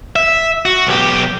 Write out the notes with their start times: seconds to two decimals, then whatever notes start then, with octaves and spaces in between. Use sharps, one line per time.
0.16 E5
0.65 F#4
0.87 B1 G4